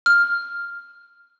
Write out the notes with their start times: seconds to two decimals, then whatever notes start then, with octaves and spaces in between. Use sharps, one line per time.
0.06 F6